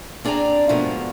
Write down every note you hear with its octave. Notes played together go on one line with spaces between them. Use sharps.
C4 D4 G#4 D5 A#5
G#2 B2 F3 A3 A#3